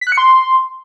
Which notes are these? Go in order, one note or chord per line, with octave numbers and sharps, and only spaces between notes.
B6
F#6
C#7
C6